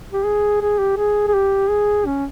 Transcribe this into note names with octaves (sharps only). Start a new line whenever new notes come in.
G4
G#4
G#4
G4
G#4
G#4
G4
G#4
C#4